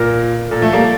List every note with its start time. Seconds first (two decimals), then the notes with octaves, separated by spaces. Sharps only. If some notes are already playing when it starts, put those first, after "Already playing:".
Already playing: A#2 A#4
0.50 A#2 A4
0.61 F3 A3
0.73 G3 A#3